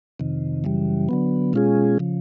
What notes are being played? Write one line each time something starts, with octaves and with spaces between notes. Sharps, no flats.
F2 C3 D#3
F#2 C#3 E3 G3
D3 F#3 B3
B2 G#3 C#4 F4 G#4
C#3 F3